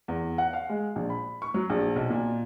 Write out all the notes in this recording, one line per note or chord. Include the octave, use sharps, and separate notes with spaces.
E2
F#5
F5
G#3
A#1
B5
C#6
F#3
A#1
B1
A#2